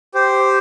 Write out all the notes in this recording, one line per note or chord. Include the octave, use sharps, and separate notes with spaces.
G4 C5